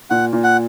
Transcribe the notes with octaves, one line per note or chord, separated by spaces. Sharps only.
A#2 F#5
A#2
F#5